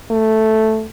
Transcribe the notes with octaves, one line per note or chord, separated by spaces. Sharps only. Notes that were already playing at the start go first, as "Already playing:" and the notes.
A3